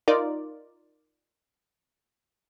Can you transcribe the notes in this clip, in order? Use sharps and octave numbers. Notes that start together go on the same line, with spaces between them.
D#4 F4 A#4 D5